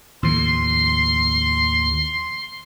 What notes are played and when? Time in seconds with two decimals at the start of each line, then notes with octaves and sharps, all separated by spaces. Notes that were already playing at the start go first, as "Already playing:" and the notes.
0.23 D#2 A2 F3 C6